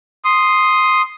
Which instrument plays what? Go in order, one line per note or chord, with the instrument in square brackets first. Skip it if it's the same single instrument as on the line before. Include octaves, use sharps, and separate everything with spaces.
[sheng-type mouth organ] C6 D#6